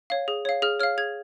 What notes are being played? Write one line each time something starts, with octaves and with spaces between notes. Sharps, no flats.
C#5 F5
G#4
C#5 F5
G#4 F6
C#5 F5 F6
G#4 G#6